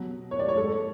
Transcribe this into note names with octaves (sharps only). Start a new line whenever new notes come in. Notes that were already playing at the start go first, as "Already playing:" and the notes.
Already playing: B2 F#3
C#5
D5
C#5
G#2 G#3 A4